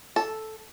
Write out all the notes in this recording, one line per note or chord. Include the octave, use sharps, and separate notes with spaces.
A4